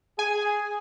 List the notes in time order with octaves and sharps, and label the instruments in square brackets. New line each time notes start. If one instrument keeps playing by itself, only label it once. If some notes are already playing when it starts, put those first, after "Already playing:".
[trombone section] G#4 [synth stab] G#5